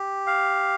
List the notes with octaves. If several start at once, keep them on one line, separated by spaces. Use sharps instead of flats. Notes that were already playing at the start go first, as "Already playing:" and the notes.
Already playing: G4
F5